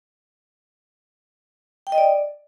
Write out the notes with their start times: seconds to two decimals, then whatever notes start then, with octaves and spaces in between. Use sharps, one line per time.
1.87 G5
1.92 D#5
1.98 D5